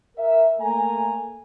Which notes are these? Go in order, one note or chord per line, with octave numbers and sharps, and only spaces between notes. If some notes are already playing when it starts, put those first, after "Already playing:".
A#4 E5
A3 A#3 G#5 A#5